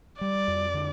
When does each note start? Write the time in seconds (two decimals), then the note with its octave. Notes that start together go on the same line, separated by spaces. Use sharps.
0.21 G3 D5
0.48 F2
0.74 D3